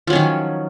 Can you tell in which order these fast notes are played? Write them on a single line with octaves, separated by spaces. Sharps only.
F3 F#3 C#4 D#3